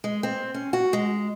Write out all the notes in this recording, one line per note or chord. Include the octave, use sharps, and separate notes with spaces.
G#3
C4
C#4
F#4
G#3